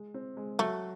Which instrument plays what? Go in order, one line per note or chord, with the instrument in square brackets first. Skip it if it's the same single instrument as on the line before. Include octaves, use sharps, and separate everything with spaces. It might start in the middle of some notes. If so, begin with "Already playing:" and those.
Already playing: [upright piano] G#3
C4
G#3
[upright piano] F#3 [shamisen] A3